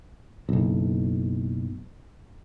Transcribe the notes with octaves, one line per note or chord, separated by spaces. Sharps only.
F#1 B1